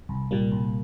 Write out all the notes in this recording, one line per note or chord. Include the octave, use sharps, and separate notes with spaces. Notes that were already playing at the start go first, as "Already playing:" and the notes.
C2
A#2 G3 A#3
C2